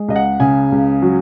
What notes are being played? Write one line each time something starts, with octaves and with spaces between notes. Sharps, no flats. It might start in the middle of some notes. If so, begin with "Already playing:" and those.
Already playing: G#3
C#2 D#5
F#5
C#3 G#5
C#2
F#3